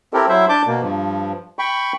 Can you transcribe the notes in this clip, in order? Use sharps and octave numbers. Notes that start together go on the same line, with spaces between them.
C4 E4 G4 A4 A#4
F#3 E4 C5 E5
D4 A5 D6 G6
B2 A#3
G2 F3
G5 B5 C#6